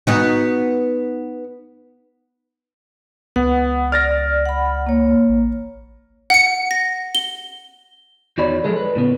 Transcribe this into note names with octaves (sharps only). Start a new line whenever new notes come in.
B3 D#4 F#4
C#2 B3 F#5
D5 F6 A6 A#6
F#5 B5
A#3 C#5
A1
F#5 C#7
A#6
G7
E2 D#4 F#4 C#5 D5 B5
F3 F#3 G#3 A4
B4
A2 C#3 B3